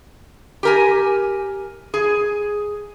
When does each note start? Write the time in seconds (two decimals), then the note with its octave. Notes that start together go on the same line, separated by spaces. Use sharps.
0.63 G4 A#4 G#5
1.94 G#4